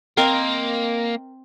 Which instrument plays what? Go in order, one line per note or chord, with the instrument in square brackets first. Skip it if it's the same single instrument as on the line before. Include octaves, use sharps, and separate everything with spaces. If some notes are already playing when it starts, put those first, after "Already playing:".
[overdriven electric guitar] A#3 [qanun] C4 A#4 D#5